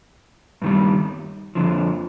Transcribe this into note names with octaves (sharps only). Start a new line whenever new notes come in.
G2 D#3 G3
F2 D3 F3